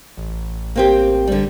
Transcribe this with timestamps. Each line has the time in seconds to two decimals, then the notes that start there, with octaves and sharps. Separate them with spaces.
0.17 A1
0.76 A#3 C4 G4
1.27 D3 G3